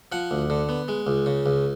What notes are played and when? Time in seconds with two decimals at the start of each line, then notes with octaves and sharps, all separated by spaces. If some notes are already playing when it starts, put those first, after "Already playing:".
0.12 F3 F#5
0.31 D2
0.50 D3
0.69 B3
0.88 G#3
1.07 C#2
1.26 C#3
1.46 C#2